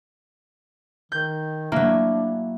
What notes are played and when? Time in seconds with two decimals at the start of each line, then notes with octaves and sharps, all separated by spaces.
1.12 D#3 G6
1.72 F#3 A#3 D4 E4